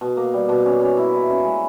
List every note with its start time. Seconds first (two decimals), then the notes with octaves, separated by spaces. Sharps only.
0.01 B2
0.17 A#3
0.34 G3
0.49 B2
0.66 C#4
0.81 C#4
0.97 E4
1.13 E4
1.30 C#4
1.45 G#3